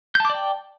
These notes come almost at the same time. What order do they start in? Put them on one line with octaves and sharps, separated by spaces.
G6 A5 D6 D5 G5